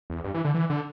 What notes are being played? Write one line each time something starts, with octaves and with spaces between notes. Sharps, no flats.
E2
G2
E3
D3
E3
D3